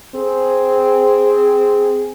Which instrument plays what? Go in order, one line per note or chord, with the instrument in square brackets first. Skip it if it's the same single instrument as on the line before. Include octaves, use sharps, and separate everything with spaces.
[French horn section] C4 G#4